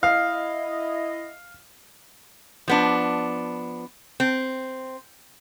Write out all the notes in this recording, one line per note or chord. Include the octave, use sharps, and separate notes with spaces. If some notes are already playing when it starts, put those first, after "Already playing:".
E4 D#5 F5
F3 B3 D4
C4